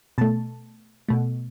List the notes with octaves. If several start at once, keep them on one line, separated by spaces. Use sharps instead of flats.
B2 A3 A5
B2 A3